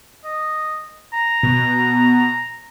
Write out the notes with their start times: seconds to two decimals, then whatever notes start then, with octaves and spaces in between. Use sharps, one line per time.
0.25 D#5
1.13 A#5
1.43 B2